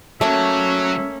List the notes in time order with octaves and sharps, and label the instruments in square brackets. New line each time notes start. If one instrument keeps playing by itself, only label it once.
[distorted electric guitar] F#3 [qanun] A3 A#3 [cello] C#4 [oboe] E5